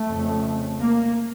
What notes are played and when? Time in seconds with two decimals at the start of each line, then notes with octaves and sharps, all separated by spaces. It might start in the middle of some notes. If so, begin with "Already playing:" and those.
Already playing: A3
0.08 F2 C#3
0.81 A#3